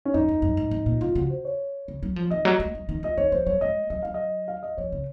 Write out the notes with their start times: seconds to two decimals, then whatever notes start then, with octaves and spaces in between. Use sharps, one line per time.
0.05 C#4
0.14 F#2 D#4
0.28 F2
0.42 F#2
0.57 G#2
0.71 G#2
0.86 A#2
1.01 C3 F4
1.15 C#3 F#4
1.30 C5
1.45 C#5
1.88 C#3
2.03 F#3
2.16 F3
2.31 D#3 D#5
2.45 F#3
2.60 G#3
2.75 F#3
2.89 D#3
3.03 F3 D#5
3.18 D#3 C#5
3.32 F3 C5
3.46 F#3 C#5
3.61 G#3 D#5
3.90 F#3 D#5
4.03 F#3 F5
4.14 D#5
4.48 F5
4.63 D#5
4.77 F3 C#5
4.92 C#3